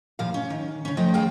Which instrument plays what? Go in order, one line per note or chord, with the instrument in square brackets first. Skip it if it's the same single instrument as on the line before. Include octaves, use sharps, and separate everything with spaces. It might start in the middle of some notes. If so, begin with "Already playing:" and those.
[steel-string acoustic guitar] D#2 A#2 F3 F5
C#4
D#3
C#3 C#4
F3 A3 D#5 G5
E2 G#4 F5 G5